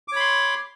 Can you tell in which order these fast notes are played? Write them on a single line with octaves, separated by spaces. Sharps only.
D6 C#5 B5 C6